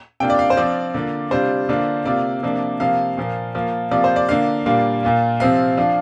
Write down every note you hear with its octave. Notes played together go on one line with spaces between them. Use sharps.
C3 A#3 D4 F4 G5
D5
F5
C5
F3 C4 F4 D5
D3 A#3 F4
C3 G3 D4 F4 C5
D3 A#3 D4 F4
C3 A#3 F4 D5
C3 F3 A#3 D4
C3 F3 A#3 F5
A#2 F3 A#3
F3 A#3 F4
C3 F3 A#3 F4 D5
C5
D5
D3 A#3 D4 F4 F5
A#2 G3 A#3 D4 F4
A#2 A#3 F4
C3 F3 C4 F4 F5
F3 D4 F4